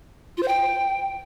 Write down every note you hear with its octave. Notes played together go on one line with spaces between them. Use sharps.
F4
C5
G5